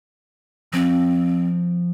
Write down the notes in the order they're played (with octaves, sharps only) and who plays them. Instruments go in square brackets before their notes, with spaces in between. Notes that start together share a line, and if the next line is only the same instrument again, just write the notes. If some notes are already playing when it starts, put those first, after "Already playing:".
[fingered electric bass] F3 [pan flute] C4